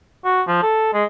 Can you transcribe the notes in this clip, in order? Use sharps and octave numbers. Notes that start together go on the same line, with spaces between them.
F#4
F3
A4
G#3